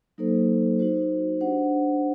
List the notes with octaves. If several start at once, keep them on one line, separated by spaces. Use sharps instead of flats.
F#3 A#3 D#4 A4 C5
D#4 F#4 C5
D4 G4 C5 F#5